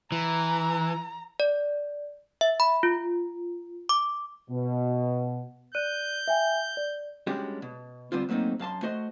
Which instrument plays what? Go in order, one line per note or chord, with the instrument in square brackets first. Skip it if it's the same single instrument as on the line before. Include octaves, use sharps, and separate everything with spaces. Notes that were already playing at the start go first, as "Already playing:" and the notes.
[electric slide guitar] E3 [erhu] A#5
[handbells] D5
E5
B5
F4
D6
[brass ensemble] B2
[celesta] D5 F#6 D#7 [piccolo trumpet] G6
[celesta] E5 G5 G#5
D5
[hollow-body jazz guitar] G3 G#3 C#4 D4 F#4 G4
B2
D3 G3 B3 C4 F4
F#3 A3 A#3 C4 D#4
F#2 F5 A5 C6
A3 F#4 C5 D#5